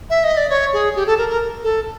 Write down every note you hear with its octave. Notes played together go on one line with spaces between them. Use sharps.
E5
D#5
D5
C#5
G#4
G4
A4
A#4
A#4
A4